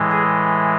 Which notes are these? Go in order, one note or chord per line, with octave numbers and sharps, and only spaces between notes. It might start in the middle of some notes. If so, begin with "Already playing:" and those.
Already playing: A2 E3 G#3
G#4